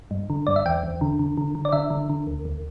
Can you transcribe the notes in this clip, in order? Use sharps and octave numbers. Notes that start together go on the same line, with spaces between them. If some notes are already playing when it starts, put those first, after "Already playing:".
G2
D3
G2 D5
E5
E2 G5
E2
D3
D3
D3
D3
D5
D3 E5
D3
D3
D2
D2